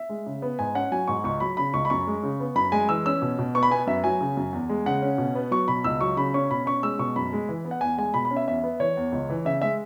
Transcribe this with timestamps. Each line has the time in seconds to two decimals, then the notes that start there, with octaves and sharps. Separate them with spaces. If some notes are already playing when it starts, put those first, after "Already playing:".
Already playing: E5
0.09 G#3
0.26 C#3
0.42 B3
0.59 G#2 G#5
0.75 C#4 F#5
0.92 F#3 G#5
1.08 G#2 C#6
1.24 C#2 C#6
1.40 F#3 B5
1.57 C#3 B5
1.74 C#2 C#6
1.85 B5
1.90 F#2 C#6
2.07 G#3
2.23 C#3
2.40 B3
2.55 F#2 B5
2.72 G#3 G#5
2.89 E3 E6
3.06 C#4 E6
3.22 B2
3.39 B2
3.55 B3 C#6
3.63 B5
3.71 B3 G#5
3.87 F#2 E5
4.04 F#3 G#5
4.21 C#3
4.37 F#2
4.53 E2
4.69 G#3
4.86 C#3 F#5
5.02 C#4
5.18 B2
5.35 B3
5.51 F#3 C#6
5.68 B2 B5
5.84 C#2 E6
6.01 F#3 C#6
6.17 C#3 B5
6.34 C#4 C#6
6.51 B2 B5
6.66 C#4 C#6
6.83 G#3 E6
6.99 B2 C#6
7.16 F#2 B5
7.33 G#3
7.49 E3
7.65 B3
7.71 F#5
7.81 E2 G#5
7.98 G#3 G#5
8.14 B2 B5
8.25 B5
8.31 C#4
8.37 E5
8.48 E2 E5
8.64 B3
8.80 E3 C#5
8.97 E2
9.12 C#2
9.30 E3
9.45 C#3 E5
9.62 G#3 E5